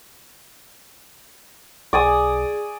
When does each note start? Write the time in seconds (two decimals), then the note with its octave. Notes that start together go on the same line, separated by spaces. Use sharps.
1.93 B1 G#4 D5 G#5 D#6